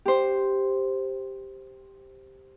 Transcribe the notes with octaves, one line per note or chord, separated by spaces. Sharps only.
G4 C5